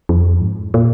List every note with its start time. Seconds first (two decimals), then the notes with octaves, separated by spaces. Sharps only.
0.09 F2
0.41 G#2
0.74 A#2